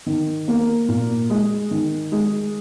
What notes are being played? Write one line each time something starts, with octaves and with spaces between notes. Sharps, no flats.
D#3
A#3
A#2
G#3
D#3
G#3